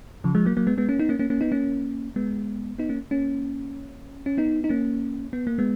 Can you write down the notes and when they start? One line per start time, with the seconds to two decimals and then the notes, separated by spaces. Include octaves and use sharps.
0.24 C#3 F3
0.35 F3 G#3
0.45 F#3 A#3
0.57 F#3 A#3
0.67 G#3 B3
0.78 G#3 B3
0.89 A#3 C#4
0.99 B3 D#4
1.09 A#3 C#4
1.19 A#3 C#4
1.30 A#3 C#4
1.41 B3 D#4
1.52 A#3 C#4
2.16 G#3 B3
2.78 B3 D#4
2.89 A#3 C#4
3.11 A#3 C#4
4.26 C#4
4.38 B3 D#4
4.64 D#4
4.69 A#3 C#4
5.33 B3
5.47 A#3
5.58 G#3 B3